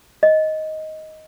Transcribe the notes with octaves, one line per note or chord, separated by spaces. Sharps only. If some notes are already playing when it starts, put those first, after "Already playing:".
D#5